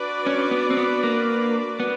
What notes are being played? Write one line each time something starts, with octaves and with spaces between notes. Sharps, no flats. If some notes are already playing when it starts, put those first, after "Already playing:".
Already playing: D4 F#4 B4 D5
C#4
B3
C4
B3
A#3
B3